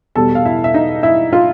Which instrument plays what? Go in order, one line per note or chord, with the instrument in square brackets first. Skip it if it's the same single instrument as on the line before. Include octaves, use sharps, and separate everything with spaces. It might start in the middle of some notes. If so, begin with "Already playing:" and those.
[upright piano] E2 B2 G3 A4 A5
F5
E4 E5
E5
D#4 D#5
E4 E5
F4 F5